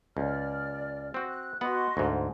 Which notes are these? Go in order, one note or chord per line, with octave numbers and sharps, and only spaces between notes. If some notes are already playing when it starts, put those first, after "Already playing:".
C#2 D5 F6
C4 F#4
F#6
B3 F#4 D#5 F#5 C6
D2 G#2